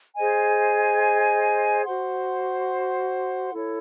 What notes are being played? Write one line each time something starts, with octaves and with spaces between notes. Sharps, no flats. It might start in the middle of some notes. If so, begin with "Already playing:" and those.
G#4 C5 D#5 G#5
F#4 C5 F#5 C6
E4 A4 C#5